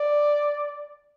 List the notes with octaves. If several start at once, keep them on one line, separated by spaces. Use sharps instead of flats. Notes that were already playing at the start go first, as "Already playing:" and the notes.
Already playing: D5